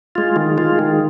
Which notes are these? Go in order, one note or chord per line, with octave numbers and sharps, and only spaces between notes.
G#3 F4
D#3
G#3 F4
D#3